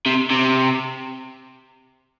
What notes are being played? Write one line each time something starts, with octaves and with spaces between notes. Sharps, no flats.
C3
C3